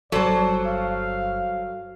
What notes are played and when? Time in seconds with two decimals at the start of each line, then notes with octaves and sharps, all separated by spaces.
0.12 G1 F#3 G3 A4 C5 D5 A5
0.66 F5